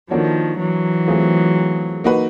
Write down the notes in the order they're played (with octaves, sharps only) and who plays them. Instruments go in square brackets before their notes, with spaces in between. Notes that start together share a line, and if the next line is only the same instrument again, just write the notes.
[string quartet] D#3 F3 [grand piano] A#3 D4 F#4 A4 C#5
[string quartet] E3 F#3
[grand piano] A3 C4 F4 G#4
A#3 D#4 F#4 B4